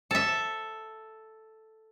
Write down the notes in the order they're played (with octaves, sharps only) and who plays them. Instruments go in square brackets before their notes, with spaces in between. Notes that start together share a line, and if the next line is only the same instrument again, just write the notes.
[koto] A4 E5